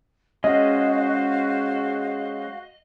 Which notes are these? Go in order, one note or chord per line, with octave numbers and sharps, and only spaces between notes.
G#3 C#4 F#4 G#4 C5 D#5 F5